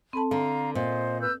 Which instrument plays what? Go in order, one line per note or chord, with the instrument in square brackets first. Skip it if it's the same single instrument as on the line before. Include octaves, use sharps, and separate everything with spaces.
[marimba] C4 A4 A5 [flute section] B5
[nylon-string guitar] D3 [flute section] F5 A#5
[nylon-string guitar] A#2 [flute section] C5 D#5
[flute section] B4 E6 G6